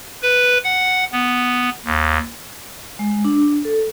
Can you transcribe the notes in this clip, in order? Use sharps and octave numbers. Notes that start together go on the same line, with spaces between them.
B4
F#5
B3
D#2
G#3
D4
A4